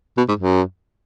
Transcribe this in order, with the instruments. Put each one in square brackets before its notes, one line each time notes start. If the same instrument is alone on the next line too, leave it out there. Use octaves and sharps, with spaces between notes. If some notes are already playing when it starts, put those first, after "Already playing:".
[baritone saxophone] B2
G#2
F#2